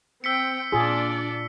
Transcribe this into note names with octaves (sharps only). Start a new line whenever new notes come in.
C4 G5 E6 B6 C#7
A#2 D4 F4 G#4 D5